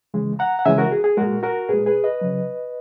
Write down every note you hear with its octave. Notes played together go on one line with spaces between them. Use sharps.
C#3 E3 G#3
F#5 A#5
F#5
C#3 E3 G#3 E5 G#5
F#4 A#4
G#4
G#4
A#2 G#3 F#4 A#4
F#4 A#4
A#2 G#3 G#4 B4
G#4 B4
B4 D#5
C#3 F#3